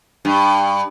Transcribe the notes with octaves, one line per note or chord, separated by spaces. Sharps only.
G2